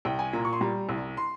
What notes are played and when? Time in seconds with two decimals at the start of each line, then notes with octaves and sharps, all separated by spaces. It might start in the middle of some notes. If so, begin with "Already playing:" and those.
0.05 C2 G5
0.19 G#5
0.33 A#2 A#5
0.45 C#6
0.53 C6
0.61 G3 A#5
0.89 C2
1.17 C6